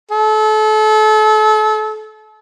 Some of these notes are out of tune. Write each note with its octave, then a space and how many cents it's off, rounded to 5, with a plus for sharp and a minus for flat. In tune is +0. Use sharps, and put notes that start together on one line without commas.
A4 -35